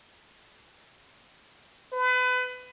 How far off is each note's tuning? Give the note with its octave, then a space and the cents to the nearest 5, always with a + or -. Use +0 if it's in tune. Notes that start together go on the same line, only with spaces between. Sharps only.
B4 +30